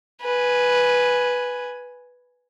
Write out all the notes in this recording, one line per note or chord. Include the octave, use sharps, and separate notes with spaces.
B4 G#5